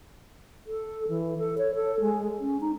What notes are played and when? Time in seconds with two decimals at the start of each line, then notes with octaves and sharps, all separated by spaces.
0.66 A4
1.08 E3
1.39 A4
1.58 C#5
1.75 A4
2.00 G#3
2.40 C#4
2.61 D#4